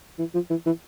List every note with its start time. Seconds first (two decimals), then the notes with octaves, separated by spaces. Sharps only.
0.19 E3
0.34 F3
0.50 E3
0.66 E3